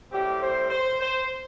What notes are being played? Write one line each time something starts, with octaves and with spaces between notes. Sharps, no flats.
A2 G3 C4 G4
C5
C5
C5